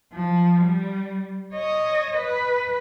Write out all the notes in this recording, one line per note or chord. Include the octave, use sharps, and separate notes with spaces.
F3
G3
C#5 D#5
B4